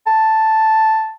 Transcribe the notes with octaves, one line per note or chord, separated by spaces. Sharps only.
A5